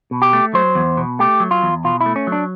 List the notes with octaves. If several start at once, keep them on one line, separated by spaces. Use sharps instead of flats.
B2
G4
A3
F#3 C5
E2
B2
A3 G4
F#3
F4
E2
B2 F4
E4
A3
C#4
F#3
D4